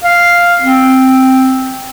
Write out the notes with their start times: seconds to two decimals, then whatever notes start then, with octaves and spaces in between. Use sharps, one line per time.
0.04 F5
0.62 C4